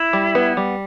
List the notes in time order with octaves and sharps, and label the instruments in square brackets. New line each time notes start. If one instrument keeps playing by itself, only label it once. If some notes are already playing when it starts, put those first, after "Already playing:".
Already playing: [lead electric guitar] E4
[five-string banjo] G3
B3
G3